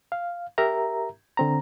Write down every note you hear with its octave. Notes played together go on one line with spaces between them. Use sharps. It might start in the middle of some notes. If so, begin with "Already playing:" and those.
F5
G4 A#4 E5 A#5
D3 C4 A#5